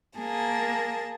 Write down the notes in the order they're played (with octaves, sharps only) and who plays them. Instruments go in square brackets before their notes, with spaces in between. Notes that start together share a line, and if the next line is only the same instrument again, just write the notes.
[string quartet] A#3 G#4 A5